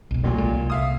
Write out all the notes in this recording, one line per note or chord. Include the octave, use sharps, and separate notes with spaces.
E1 B1
A1 A#2 F#3
B1 A#2 G#3
C2
E5 F5 D#6